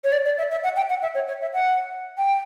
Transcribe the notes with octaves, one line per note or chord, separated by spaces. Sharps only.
C#5
D5
D5
E5
E5
F#5
G5
F#5
E5
C#5
C#5
E5
F#5
G5